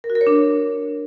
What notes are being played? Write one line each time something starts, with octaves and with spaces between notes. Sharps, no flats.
A#4
F#4
A#4
C#5
D4